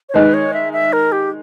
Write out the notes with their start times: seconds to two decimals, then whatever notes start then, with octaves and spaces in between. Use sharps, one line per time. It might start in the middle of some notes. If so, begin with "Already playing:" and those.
0.09 C#5
0.14 D#3 G#3 D#4 B4
0.34 C#5
0.54 E5
0.73 E5
0.93 A#4
1.12 G4